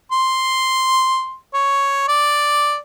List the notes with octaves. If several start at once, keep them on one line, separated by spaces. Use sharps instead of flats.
C6
C#5
D5